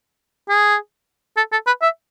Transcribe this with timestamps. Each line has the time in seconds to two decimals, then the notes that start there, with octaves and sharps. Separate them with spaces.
0.49 G#4
1.37 A4
1.52 A4
1.67 B4
1.82 E5